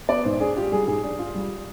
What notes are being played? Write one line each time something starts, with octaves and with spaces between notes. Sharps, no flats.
B3 D5
G#2 C5
D4 G#4
F4 G4
G3 G#4
G#2 G#4
D4
F4
G3